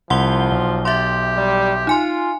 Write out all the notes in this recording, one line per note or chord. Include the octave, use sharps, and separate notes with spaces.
C2 F3 F#5 C6 G7
B1
G4 E5 C6
G3
D#4 F4 G#5 C6